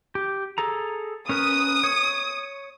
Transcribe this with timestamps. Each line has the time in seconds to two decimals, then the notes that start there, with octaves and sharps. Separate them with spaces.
0.15 G4
0.58 G#4 A4 A#5
1.29 C#4 A#4 B4 D#6
1.84 C#5